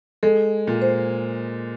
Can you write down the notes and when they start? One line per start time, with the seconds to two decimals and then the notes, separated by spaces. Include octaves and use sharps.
0.23 G#3 A4
0.67 A#2
0.82 C5